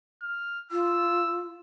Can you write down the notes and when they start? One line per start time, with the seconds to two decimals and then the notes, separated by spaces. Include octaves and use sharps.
0.22 F6
0.71 F4 E6